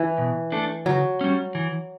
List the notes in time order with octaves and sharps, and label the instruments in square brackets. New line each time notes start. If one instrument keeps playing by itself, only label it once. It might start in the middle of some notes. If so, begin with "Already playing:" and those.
Already playing: [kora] E3
[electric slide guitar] B2
A3 D4 A4
[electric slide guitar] C#3 [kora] F#3
[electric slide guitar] G3 C#4
E3